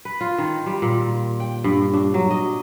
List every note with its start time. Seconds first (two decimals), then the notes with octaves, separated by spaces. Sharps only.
0.05 B4
0.21 F4
0.38 D#3
0.66 G3
0.82 A#2
1.40 G5
1.64 G2
1.94 D4
2.14 F#3
2.31 D#5